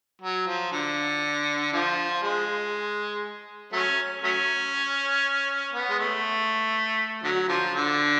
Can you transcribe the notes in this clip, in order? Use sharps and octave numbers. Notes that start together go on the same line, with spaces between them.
F#3
F3
D3
D3 F3
G#3
F#3 A3 C#4
F#3 A3 C#4
B3
G#3
A3
D3 F#3
D3 F3
D3